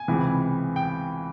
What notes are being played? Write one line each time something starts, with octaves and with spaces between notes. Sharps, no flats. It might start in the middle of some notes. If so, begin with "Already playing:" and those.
Already playing: G#5
C#2 C3 E3
G5